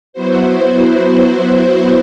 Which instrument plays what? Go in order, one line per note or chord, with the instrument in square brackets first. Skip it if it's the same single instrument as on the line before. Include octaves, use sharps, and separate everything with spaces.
[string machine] F#3 B3 E4 F#4 C5